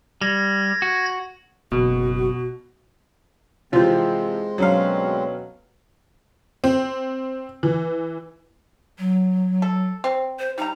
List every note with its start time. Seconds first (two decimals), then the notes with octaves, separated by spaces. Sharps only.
0.21 G3 G#6 A#6
0.82 F#4
1.72 F#1 B2 F#4
3.73 C3 E3 F3 G#3 C4 F4 C5
4.58 D2 B2 F#3 C#4 C#5 F5
6.64 C4
7.63 E3
8.99 F#3
9.62 A4
10.04 C4
10.39 C5
10.58 G3 D#4 A#5